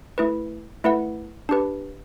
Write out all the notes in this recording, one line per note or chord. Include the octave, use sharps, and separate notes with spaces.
A3 E4 B4
A3 E4 B4 F#5
D4 G4 B4